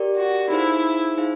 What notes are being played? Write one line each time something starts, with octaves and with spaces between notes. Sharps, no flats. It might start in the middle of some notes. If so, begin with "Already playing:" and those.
Already playing: G4 A#4 D5
F#4
D#4 E4 G#4 C5 F5
D#4 G#4 C5 F5